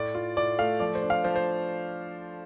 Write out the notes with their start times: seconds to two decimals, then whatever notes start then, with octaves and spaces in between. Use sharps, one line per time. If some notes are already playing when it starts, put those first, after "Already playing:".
Already playing: A2 D5
0.15 F4
0.37 A2 D5
0.59 A3 F5
0.80 F3 D5
0.95 C5
1.02 D4
1.10 F5
1.24 F3 C5
1.36 C5